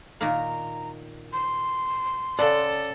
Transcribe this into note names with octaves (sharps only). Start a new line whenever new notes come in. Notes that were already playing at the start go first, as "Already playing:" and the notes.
A#2 D#3 A#3 A#5
C6
C#3 A4 D5 F#5